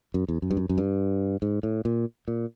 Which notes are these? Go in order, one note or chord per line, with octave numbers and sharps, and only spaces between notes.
F#2
E2
F#2
G2
F#2
F#2
G2
G#2
A2
A#2
A#2